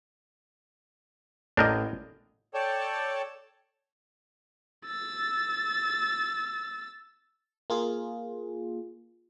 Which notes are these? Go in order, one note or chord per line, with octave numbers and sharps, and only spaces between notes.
A1 D4 A4 A#4 D#5 G6
A4 C#5 D5 G5 A5
E6 A6
A#3 F4 G#4